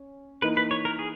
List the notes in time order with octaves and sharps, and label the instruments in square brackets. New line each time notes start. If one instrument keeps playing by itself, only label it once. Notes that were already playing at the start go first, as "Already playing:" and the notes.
Already playing: [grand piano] C#4
[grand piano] E3 A#3 D#4 [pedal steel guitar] B4
[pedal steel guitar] B4
C#5
A#4
G#4